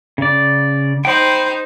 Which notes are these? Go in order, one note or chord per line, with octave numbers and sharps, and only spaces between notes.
C#3 D5
D#4 C5 G5 B5